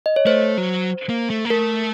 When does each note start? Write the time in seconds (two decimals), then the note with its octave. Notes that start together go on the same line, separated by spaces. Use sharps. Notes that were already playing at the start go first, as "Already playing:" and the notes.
0.06 D#5
0.16 C#5
0.26 A3 C5
0.58 F#3
1.09 A#3
1.30 A3
1.45 A#3
1.50 A3 A#4